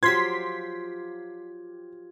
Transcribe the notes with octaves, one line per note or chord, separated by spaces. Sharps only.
F3 F#3 F4 G4 C6 G#6 B6